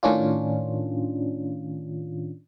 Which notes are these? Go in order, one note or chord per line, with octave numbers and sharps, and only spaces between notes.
A2 D#3 C#4 D4 F4